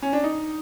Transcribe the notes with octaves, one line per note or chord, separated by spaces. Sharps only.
C#4
D4
D#4